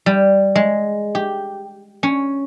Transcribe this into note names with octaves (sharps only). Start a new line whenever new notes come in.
G3
G#3
G4
C#4